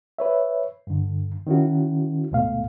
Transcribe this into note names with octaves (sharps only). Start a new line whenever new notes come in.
B4 C#5 E5
G2 D3
D#3 C#4 E4 F#4
D2 G#2 B2 A3 F5